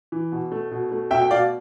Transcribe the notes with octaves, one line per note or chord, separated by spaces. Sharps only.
E3
B2
A3
B2
A3
B2 E5 G5
G5
B2 D5 F5